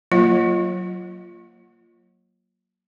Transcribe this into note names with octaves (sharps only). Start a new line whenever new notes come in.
F#3 A#3 F4 D#5 F#5